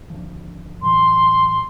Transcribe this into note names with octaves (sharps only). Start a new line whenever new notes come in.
G#1 D2 F3
A2 E3 F#3 C6